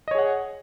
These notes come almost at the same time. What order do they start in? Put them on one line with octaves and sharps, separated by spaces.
D#5 C#5 G#4 F#5